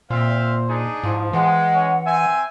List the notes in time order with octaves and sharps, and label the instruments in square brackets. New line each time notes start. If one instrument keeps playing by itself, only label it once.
[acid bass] A#2 [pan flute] A#3 [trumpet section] C4 E5 F5 [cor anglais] C5
[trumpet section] D4 D#4 G#4
[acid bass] G#2 [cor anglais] F3 [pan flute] E4
[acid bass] E3 [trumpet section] G#3 [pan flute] F#5
[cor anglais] C#4
[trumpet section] C4 G#5 [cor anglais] E5